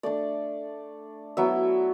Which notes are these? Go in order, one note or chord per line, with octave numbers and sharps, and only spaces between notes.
A3 D4 D5
F#3 B3 E4 E5